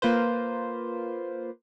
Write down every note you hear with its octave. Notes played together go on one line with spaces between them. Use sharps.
A#3 F4 B4 C5